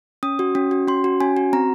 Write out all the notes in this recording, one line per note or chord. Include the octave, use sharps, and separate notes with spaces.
C#4 D#6
F#4
C#4
F#4
C#4 C6
F#4
C#4 G#5
F#4
C4 A#5